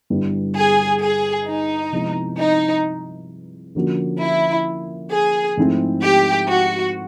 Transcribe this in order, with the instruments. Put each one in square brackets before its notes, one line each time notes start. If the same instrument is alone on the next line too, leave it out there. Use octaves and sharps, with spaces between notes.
[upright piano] G2 D3 G3 B3 E4
[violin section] G#4
G#4
D#4
[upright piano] C3 F3 G#3 B3 E4
[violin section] D#4
[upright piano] D3 F3 A#3 C#4 F#4
[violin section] E4
G#4
[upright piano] G#2 F3 A3 C4 E4
[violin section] G4
F#4